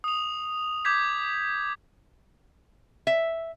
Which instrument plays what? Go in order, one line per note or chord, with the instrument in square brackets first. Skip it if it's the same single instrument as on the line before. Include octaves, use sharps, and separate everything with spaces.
[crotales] D#6 F7
D6 G6 G#6 B6
[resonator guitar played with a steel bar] E5